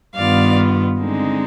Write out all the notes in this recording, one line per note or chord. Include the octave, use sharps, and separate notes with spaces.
G2 D#3 B3 F4 D5 F5
D3 G#3 C4 D#4